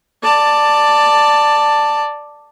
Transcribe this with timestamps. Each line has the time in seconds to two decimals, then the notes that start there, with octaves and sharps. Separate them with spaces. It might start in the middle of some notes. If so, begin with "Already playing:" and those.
0.23 D5 A5